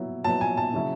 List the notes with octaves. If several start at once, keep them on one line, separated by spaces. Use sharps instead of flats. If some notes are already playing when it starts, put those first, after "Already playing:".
Already playing: F#3 B3 E4
F#3 B3 E4 A5
G#5
A5
C#3 F#3 C#4 E4